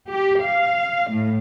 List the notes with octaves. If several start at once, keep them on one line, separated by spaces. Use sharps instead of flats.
G4
F5
A2